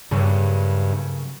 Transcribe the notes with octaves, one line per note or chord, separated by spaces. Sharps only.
G2 C#3 F#3